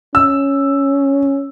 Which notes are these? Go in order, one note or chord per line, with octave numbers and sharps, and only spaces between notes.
C#4 E6